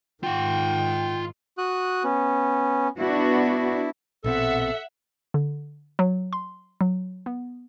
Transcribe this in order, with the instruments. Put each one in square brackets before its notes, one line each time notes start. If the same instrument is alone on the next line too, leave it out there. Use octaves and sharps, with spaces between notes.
[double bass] G#2 D#3 [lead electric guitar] F4 F#5 [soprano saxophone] G5
[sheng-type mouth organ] F#4 D#6 F#6
B3 C#4
[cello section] B3 D4 F#4 [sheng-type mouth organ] E4
[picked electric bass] A#1 B2 C4 [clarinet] A4 [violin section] E5 F#5
[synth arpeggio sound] D3
F#3
C6
F#3
B3